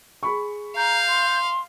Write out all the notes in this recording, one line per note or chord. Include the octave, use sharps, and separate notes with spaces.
G#4 B5 C#6
F5 A#5 G6
C6